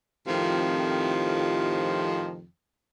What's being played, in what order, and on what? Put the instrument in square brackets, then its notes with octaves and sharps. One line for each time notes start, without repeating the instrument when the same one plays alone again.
[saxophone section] F2 A2 C3 D#3 F3